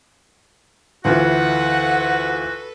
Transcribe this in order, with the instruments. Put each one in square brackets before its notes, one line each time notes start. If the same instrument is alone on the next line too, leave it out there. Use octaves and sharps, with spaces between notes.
[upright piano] D2 E3 F4 [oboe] F#4 [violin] A4 B4 [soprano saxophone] F#5